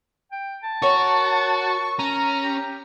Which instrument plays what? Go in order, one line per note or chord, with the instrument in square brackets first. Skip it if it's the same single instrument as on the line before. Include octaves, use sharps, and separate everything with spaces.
[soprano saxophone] G5
A5
[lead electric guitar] F#4 [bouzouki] A#4 C#5 [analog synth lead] C#6
[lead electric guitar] C#4 [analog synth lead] A#5
[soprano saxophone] G4